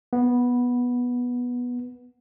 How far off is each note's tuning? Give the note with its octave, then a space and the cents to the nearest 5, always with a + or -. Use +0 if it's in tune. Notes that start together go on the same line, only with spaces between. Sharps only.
B3 -10